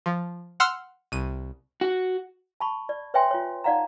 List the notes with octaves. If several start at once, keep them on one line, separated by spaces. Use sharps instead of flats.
F3
F#5 C6 E6 F6
C2 D#7
F#4
A5 B5 C#6
D5
B4 C#5 E5 G5 G#5 C6
F4 C#5
D#4 D5 F5 F#5 A#5